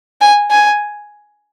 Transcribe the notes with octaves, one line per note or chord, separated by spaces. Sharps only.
G#5
G#5